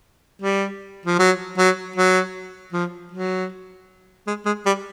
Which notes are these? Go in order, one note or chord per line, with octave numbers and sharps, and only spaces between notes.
G3
F3
F#3
F#3
F#3
F3
F#3
G#3
G#3
G3